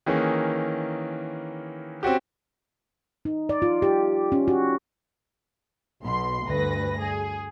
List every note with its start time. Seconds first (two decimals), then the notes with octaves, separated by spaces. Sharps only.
0.06 D#3 E3 A#3 C#4 G#4
2.03 C4 C#4 F#4 G4
3.25 D#4
3.49 D5
3.62 F4
3.82 G4
4.32 C#4
4.48 F#4
6.03 B1 B2 C6
6.47 D2 G2 B4 A#6
7.00 G#4